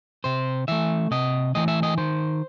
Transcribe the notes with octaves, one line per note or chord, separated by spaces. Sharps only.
C3 C5
E3 A3 E5
C3 D#5
E3 A3 D#5
E5
D#5
D#3 C5